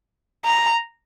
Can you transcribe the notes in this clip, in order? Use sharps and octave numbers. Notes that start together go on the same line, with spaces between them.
A#5